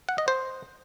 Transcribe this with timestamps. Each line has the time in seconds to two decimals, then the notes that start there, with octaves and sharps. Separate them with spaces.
0.09 F#5
0.18 D#5
0.28 C5